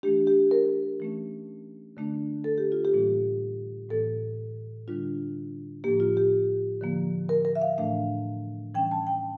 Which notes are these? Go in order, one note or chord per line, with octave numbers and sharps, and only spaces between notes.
E3 A3 D4 G4
G4
A#4
E3 A3 C#4
D3 A3 D4
A4
G4
F4
G4
A2 E3 G3 A#3
A2 E3 A#3 A4
D3 G3 D4 F4
A2 F3 A#3 G4
F4
G4
D3 F3 A#3
A#4
A#4
E5
F5
A2 E3 A3 D4 F5
E3 G3 C#4 G5
A5
G5